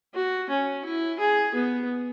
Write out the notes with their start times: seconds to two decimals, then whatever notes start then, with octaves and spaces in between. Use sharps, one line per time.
0.14 F#4
0.50 C#4
0.85 E4
1.19 G#4
1.54 B3